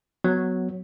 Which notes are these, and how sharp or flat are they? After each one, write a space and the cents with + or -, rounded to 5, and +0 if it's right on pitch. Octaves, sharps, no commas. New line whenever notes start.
F#3 +0 B3 +10